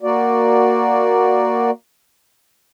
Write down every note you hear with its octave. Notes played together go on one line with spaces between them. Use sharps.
A#3 F#4 D5